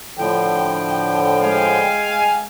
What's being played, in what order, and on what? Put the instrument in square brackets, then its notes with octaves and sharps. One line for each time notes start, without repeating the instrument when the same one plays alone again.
[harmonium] A2 D3 F3 [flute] G5
[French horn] G#3 [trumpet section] F5 G#5